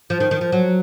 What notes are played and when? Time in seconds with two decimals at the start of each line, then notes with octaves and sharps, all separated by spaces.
0.10 F3
0.20 D#3
0.31 D#3
0.41 F3
0.52 F#3